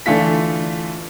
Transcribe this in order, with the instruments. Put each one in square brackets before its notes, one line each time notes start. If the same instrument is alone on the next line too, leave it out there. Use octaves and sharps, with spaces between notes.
[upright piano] D3 E3 A3 F4 B6